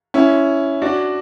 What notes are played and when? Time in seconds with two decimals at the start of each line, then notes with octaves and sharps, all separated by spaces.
0.14 C#4 E4
0.82 D4 F#4